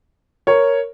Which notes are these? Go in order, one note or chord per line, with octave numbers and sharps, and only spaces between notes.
A#4 C#5